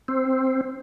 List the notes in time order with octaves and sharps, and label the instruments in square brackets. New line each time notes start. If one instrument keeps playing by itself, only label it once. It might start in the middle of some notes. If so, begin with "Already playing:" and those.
[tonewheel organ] C4